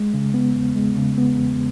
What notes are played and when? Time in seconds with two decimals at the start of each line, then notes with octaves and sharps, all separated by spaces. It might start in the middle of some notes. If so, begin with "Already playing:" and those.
Already playing: G#3
0.14 C#3
0.34 B3
0.56 E2
0.76 G#3
0.97 C#3
1.18 B3
1.38 E2